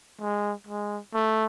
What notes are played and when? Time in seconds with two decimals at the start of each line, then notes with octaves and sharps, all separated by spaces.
0.21 G#3
0.67 G#3
1.14 A3